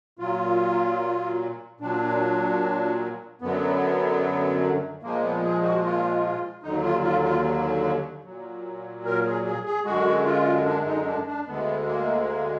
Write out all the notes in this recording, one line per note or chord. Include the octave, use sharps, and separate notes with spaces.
A#2 F#3 F4
A#2 F#3 D4
F#2 D3 F#3 B3
A#2 F3 G#3 A#3
B3
G#4
F#4
F4
D#2 D3 F#3 D#4
F4
F4
F4
A#2 F#3
A#4
G#4
G#4
G#4
F#2 D3 G#3 F#4
F4
D4
D#4
D4
D4
D2 D3 G#3 B3
A#3
A#3